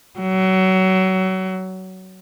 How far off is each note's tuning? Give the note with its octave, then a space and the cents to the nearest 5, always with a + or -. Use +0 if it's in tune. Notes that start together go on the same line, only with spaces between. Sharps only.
F#3 +25